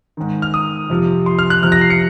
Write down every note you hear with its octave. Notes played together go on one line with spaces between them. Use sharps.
G#2 D#3
F6
D#6
F2 C3 F3
C6
F6
F#6
F2 C3 F3 F6
A#6
C7
C#7